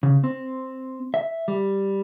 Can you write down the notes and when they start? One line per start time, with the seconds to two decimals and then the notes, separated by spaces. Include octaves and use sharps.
0.03 C#3
0.24 C4
1.14 E5
1.48 G3